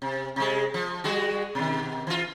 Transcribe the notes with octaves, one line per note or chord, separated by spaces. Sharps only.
C3
C3 G#3
F3
G3 G#3 F#4
B2 D#3
E3 F4